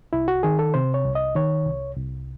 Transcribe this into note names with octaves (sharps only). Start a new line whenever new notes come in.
C2 E4
F#4
D#3 G#4
A4
C3 C5
C#5
C2
D#5
D#3 C#5
C2
C2